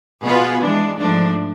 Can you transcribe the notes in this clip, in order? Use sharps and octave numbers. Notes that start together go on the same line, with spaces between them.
B2 B3 F4 G#4 B4
E3 G#3 D4
G#2 F3 A3 D4